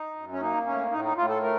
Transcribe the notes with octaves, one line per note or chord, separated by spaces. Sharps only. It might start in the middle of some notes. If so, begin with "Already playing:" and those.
Already playing: D#4
F#2
C#4
A#3 D#4
A2 C#4
A2 D#4
D#4
A2 F4
A4
A3 A#4